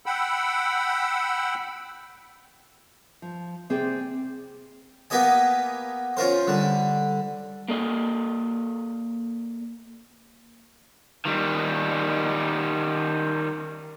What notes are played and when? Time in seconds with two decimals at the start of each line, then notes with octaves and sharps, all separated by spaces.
0.06 F#5 G5 B5 E6
3.22 F3
3.70 C3 C4 G#4 D5 G5
5.10 A#3 B3 G4 D#5 G#5
6.17 C#4 F4 A#4 C5
6.48 D3 G3
7.68 A#3 A4 D5 D#5
11.25 D#3 G3